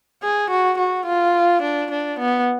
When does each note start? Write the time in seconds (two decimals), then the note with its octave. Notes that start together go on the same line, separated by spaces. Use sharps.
0.23 G#4
0.50 F#4
0.78 F#4
1.07 F4
1.63 D4
1.91 D4
2.19 B3